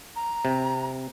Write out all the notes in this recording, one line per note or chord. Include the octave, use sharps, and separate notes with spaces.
A#5
C3